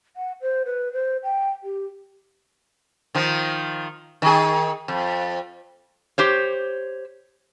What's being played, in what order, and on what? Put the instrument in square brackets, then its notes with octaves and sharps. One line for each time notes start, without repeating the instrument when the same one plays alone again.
[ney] F#5
C5
B4
C5
G5
G4
[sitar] D#3 F3
D#3 G#4
F2
[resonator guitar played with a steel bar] G4 C5 C#5